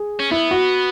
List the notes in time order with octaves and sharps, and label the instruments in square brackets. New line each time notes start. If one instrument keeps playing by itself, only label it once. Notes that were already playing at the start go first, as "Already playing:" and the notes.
Already playing: [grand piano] G#4
[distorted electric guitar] C#4
[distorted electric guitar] B3 [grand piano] E4
[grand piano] F#4